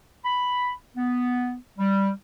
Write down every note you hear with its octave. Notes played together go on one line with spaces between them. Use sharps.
B5
B3
G3